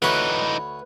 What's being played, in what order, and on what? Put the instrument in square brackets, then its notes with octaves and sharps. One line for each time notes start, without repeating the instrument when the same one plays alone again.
[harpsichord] D2 C#5 [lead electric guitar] E3 D#4 [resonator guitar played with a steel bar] B4